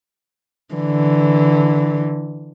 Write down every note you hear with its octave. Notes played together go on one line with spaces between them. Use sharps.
D3 E3